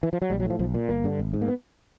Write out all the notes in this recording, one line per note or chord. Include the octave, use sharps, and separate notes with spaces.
E3
F3
F#3
A#1 G3
F#3
A2 F3
B1 F3
A#2
G1 A#3
G2 D3
G#1
G#2
A#3
B3